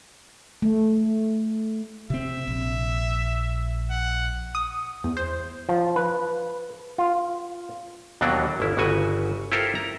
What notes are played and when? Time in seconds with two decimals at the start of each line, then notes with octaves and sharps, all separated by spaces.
0.62 A3
2.10 C3 C4 E5
2.47 A#1
3.90 F#5
4.55 D#6
5.04 E2
5.17 C5
5.69 F3
5.96 B4
6.98 F4
8.21 D#2 B2 E3 F#3 D4 F#4
8.60 G1 E4
8.77 G1 C#3 F#4 G#5
9.52 E4 F4 G4 A4 A#4 C5
9.75 A#5